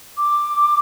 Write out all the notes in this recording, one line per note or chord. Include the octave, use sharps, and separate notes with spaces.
D6